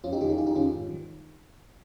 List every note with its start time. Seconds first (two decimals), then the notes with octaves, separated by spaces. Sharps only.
0.04 F2 C#4 F4
0.12 D#4 G4
0.21 D#3 F4 G#4
0.29 D#4 G4
0.38 F2 F4 G#4
0.47 D#4 G4
0.55 D#3 C#4 F4
0.73 G#2
0.90 D#3